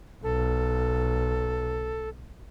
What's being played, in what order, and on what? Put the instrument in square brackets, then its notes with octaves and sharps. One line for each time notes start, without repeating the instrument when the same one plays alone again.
[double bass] B1 [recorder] A4